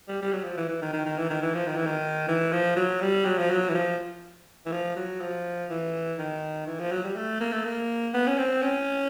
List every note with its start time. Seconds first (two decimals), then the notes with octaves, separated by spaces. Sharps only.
0.08 G3
0.22 G3
0.32 F#3
0.44 F3
0.57 E3
0.69 E3
0.81 D#3
0.93 D#3
1.05 D#3
1.18 E3
1.30 D#3
1.42 E3
1.54 F3
1.67 D#3
1.76 E3
1.86 D#3
2.28 E3
2.52 F3
2.76 F#3
3.01 G3
3.25 F#3
3.38 F3
3.50 F#3
3.68 E3
3.74 F3
4.66 E3
4.72 F3
4.96 F#3
5.21 F3
5.70 E3
6.19 D#3
6.67 E3
6.79 F3
6.91 F#3
7.04 G3
7.16 A3
7.40 A#3
7.52 A3
7.65 A#3
8.14 B3
8.27 C#4
8.38 C4
8.62 C#4